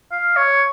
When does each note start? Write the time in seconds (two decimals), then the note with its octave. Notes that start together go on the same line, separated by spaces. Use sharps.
0.12 F5
0.36 C#5